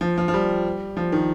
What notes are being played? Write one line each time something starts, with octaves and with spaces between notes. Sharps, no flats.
F3
F3
F3
G3
F3
D#3